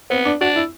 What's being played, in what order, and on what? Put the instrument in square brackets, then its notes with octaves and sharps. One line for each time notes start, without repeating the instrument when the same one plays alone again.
[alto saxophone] B3 [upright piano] C4
[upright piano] D4
[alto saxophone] D4 [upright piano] F#4
[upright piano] E4